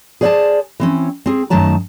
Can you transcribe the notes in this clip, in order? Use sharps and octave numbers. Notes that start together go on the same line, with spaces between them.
G#4 C5 D5 F5 G#5 A5
E3 C4 C#4
C4 G#4
F#2 D#3 F#3 A3 A5 A#5